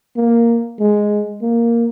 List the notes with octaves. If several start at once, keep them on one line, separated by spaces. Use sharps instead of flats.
A#3
G#3
A#3